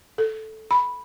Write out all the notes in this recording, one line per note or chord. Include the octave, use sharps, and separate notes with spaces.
A4
B5